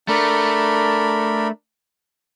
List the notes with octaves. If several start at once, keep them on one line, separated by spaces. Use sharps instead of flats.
A3 D4 A#4 B5